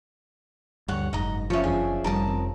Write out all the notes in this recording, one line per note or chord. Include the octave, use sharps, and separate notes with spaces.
D2 G2 C#5 F#5
F#1 G#2 D#5 A#5
F3 F#3 C#4 C#5 E5
D4 G#4 E5 G#5
F1 G3 A#4 A5 D#6
C4